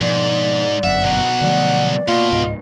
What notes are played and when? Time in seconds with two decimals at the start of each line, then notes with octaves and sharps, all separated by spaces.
0.01 G#2 B2 F3 D5
0.83 G1 F#2 E5 F#5
1.04 B2 F#3
1.41 D3 F3 A3 D5
2.08 B2 A#3 F4
2.32 C#2 G#2 D#5